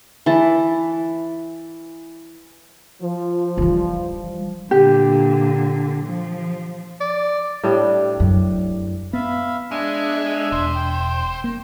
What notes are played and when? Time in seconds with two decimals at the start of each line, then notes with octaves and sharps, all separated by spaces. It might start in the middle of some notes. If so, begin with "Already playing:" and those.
0.26 E3 A5
3.02 F3
3.58 E3 G3
4.71 A#2 D3 G4
6.05 F3
7.01 D5
7.64 A2 G3 D4
8.20 F#2
9.13 B3 E5 F5 B5
9.71 G#3 D4 E5 G#5
10.52 E1 C5
10.75 G5
11.44 A#3